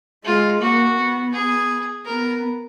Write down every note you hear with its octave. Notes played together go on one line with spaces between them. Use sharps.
G#3 F4
A#3 F#4
B3
G#4
B3 A#4